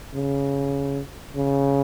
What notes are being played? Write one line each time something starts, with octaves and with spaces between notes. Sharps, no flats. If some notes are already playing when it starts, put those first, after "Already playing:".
C#3
C#3